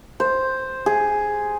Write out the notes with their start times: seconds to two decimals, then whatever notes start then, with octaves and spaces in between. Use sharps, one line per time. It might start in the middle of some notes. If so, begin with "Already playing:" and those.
0.20 C5
0.86 G#4